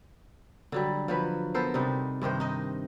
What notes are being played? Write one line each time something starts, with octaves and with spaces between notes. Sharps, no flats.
D3 F#3 G3
F3 F#3 B4
B3 A4 A#4 C5
C3 G3 D#4
G2 C3 D#3 C5
D#4 D#5